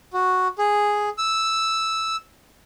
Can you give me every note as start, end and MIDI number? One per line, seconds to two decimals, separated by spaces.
0.13 0.48 66
0.59 1.09 68
1.18 2.16 88